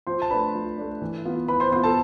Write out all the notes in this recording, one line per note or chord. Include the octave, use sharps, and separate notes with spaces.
F3 C5 C6
A5
A3 D4 B4 B5
F3
A3 D4
E3
B3 F4
E3 B4 B5
C5 C6
B3 F4 C5 C6
A4 A5